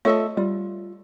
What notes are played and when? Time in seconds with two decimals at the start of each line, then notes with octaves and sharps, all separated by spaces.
0.05 A3 F4 A4 C#5 D#5 E5 C#6
0.37 G3 F4